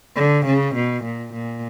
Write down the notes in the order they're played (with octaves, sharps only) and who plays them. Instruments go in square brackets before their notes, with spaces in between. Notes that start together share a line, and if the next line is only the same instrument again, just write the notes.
[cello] D3
C#3
B2
A#2
A#2